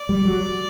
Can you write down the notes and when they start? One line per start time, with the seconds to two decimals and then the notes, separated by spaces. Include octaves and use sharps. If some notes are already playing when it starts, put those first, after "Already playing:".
Already playing: D5
0.09 G3
0.25 F#3